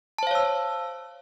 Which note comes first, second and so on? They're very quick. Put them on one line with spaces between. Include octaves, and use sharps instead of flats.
A5 C5 F5 C#5 E6